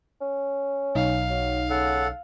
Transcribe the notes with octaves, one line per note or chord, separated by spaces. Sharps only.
C#4
B1 D#4 F5
F#3
C#3 A4 F#5